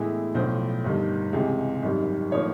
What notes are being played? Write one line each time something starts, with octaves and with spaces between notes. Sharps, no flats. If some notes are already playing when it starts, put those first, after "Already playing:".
Already playing: A2 E3 G#3 B3 E4
B1 A2 F3 C5
G1 G2 D#3
C#2 C3 E3 G#3
G#1 F#2 D#3 G3
A2 F3 A#3 D#4 C#5